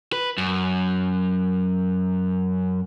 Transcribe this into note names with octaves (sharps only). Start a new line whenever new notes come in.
B4
F#2